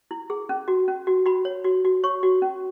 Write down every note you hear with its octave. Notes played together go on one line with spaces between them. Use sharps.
E4
G#4
C#4
F#4
C#4
F#4
F#4 B5
C#5
F#4
F#4
C#5 C#6
F#4
C#4